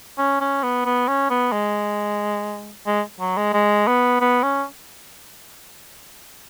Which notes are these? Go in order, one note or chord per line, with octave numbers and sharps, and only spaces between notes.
C#4
C#4
B3
B3
C#4
B3
G#3
G#3
F#3
G#3
G#3
B3
B3
C#4